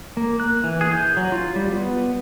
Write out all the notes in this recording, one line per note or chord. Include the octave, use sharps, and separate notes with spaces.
A#3
F#6
E3
G#4
G6
F#3
F4
G3
B3